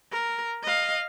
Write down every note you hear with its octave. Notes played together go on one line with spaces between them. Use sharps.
A#4
D#5 F5